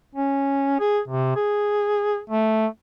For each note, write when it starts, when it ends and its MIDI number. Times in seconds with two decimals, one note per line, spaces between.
0.15 0.76 61
0.80 0.99 68
1.08 1.34 48
1.36 2.18 68
2.30 2.66 57